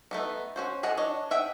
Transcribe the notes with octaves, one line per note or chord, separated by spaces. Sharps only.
A3 B3 D#4
C#4 F#4 C5
G#4 A4 D#5 F#5
D4 C#5 D#5
D#5 E5 F#5 G5